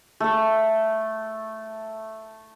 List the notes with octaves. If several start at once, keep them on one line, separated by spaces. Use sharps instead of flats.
A3 A4